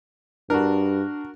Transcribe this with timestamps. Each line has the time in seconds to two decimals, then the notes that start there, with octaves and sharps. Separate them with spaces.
0.50 G2 D4 F#4 A#4